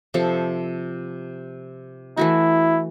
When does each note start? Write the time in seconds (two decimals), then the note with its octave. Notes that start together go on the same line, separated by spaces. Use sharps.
0.14 C3 F3 A4
2.17 E3 A3 E4 F#4